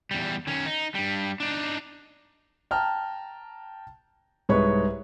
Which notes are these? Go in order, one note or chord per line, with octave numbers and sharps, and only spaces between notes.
E2 G3
D#3 C#4
D#4
G2 G3
D4 D#4
G5 A5 A#5 F6
C2 G#2 G#3 B4 C#5 C#6